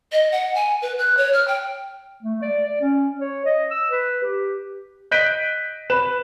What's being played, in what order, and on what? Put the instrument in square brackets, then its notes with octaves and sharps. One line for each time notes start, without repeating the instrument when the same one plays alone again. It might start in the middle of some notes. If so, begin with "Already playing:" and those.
[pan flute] D#5
F#5
G#5
B4
F#6
C#5
F6
G5
[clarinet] A3
D5
D5
C#4
C#5
D#5
E6
B4
G4
[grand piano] D#5 F#6 G6 B6 D7 D#7
B4 E7